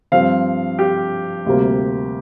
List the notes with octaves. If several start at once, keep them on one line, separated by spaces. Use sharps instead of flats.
G2 F3 C4 F5
G4
D2 C3 G3 A#3